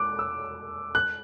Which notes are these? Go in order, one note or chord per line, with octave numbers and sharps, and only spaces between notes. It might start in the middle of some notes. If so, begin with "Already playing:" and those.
Already playing: D6 F#6
E6
F#6